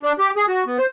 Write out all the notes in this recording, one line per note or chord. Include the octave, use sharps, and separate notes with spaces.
D4
G4
G#4
F#4
B3
C5